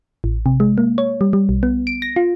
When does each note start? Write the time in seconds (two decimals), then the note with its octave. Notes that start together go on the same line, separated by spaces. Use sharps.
0.24 A1
0.46 C3
0.60 G#3
0.78 A#3
0.98 C#5
1.21 G3
1.33 G3
1.49 B1
1.63 B3
1.87 D7
2.02 A#6
2.16 F4